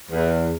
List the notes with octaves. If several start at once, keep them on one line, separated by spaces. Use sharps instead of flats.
E2